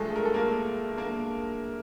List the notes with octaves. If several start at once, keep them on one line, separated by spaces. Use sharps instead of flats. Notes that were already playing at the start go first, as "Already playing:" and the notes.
Already playing: G2 D3 F3 G#3 A3 G#4 A4
A#4
A4
A#3 A#4
A#3 A#4